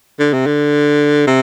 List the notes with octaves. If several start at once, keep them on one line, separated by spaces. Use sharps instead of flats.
D3
C3
D3
C3